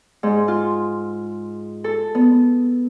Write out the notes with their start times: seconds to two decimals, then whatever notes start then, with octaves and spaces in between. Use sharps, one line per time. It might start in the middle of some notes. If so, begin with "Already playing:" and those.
0.23 G#2
0.48 F4
1.84 A4
2.15 B3